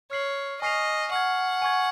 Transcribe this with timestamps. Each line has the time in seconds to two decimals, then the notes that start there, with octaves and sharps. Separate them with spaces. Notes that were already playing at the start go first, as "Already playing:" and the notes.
0.11 C#5 F6 C7 F#7
0.62 D#5 G#5 C#6 F6 C7 F7
1.12 F#5 C#6 F6 G#6
1.62 G#5 C#6 G#6